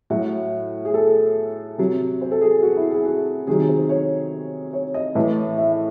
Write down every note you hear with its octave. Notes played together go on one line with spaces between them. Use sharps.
A2 F#3 F#4
G#4
A4
C3 F#3
C5
A4
G#4
F#4
E4
G#4
F#4
C3 D#3 F#3 G#4
C5
C#5
C#5
D#5
A2 E3
E5